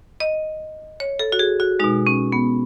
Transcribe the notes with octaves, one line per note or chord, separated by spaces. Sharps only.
D#5
C#5
A4
F#4
G#4
F#4
B2 G#3 D#4
C#4
B3